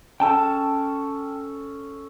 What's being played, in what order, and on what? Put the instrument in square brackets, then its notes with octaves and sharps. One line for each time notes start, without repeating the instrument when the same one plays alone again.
[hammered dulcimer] C#4 A4 [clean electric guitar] G5 A5